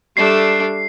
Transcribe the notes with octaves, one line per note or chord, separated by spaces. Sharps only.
G3 A3 D4 C7